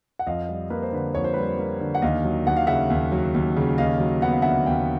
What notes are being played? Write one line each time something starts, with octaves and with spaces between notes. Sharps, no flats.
F#5
F2 D#5 F5
G3
A#3 B4
C5
D3 B4
F2 C#5
C5
G3 B4
C5
A#3
D3
F#5
D#2 D#5 F5
F#3
D#2 F#5
F5
C#3 E5 F#5
D#2
F#3
D#2
C#3
D#2 D#5 F5
F#3
B3 F#5
F5
D3 E5 F#5
D#2 F5 G5